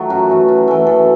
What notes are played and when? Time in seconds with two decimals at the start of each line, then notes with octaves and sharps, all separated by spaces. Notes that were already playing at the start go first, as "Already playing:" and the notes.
Already playing: D#3 F#3 A3
0.10 F#2 F#4
0.29 E3 A3
0.48 F#2
0.68 E3 A3
0.87 F#2 A4